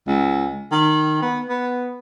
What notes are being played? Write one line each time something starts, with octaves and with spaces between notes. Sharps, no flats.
C#2
D#3
B3
B3